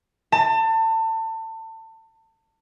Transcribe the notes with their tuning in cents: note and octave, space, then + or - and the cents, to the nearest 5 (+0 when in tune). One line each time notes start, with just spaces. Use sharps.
A5 +30